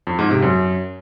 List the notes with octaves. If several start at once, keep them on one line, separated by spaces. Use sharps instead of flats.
F2
G#2
C3
F#2